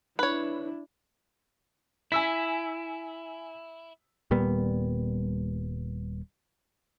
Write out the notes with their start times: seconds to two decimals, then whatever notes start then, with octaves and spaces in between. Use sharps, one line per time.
0.19 D4 E4 B4 C#5
2.12 E4 G#5 E6 B6
4.31 D#1 A#2 G3 B3